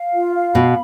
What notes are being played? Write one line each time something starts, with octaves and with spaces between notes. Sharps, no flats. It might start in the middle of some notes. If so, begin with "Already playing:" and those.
Already playing: F5
F4
F5
B2 B5